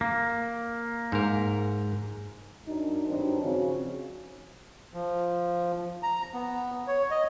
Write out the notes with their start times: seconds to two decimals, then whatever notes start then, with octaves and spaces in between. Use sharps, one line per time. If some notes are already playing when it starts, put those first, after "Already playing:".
0.01 A#3
1.12 G#2 A#4
2.66 F#2 F#3 D4 D#4
3.08 G2 D#3 F#3 C4 D4 D#4
3.42 C#3 F3 C4 C#4 F#4
4.94 F3
6.03 A#5
6.34 B3
6.87 C#5
7.11 D#5